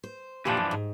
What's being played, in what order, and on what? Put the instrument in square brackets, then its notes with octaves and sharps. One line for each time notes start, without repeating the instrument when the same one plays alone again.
[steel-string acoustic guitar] C5
[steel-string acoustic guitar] F2 A#2 G4 [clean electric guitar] E3 F3 D4
[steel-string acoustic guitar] F#2
G#2